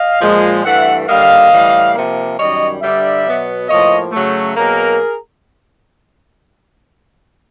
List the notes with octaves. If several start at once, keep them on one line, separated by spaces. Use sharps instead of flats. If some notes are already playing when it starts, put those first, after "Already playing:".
Already playing: D#5 F5
A#2 F3 G#3
G2 E3 A3 E5 F#5
D3 G3 A#3 D#5 F5
A2 E3 G3
C3 F3 A#3
F#2 D#3 G3 C#5 D#5
G2 D3 G3 D5 E5
B2 F#3 B3
A2 F3 A#3 C#5 D#5
C#3 F#3 A3
B2 F#3 A#3 G#4 A#4